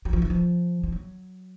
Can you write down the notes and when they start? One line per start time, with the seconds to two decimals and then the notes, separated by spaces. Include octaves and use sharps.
0.05 F#3
0.13 F3
0.22 E3
0.30 F3
0.83 F3
0.92 F#3